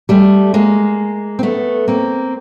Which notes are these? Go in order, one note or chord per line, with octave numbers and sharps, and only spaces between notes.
G3 A3
G#3 A#3
C4
A3 B3
A#3 C4